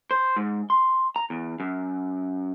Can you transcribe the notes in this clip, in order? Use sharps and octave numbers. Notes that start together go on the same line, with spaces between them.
C5
G#2
C6
A#5
E2
F#2